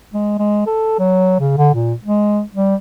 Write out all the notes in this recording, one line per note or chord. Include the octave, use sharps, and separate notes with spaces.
G#3
G#3
A4
F#3
C#3
D3
A#2
G#3
G3